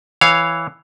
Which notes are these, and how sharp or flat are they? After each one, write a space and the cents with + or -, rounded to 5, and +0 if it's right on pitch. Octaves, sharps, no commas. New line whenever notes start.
E3 +0 C#5 +0 F5 -5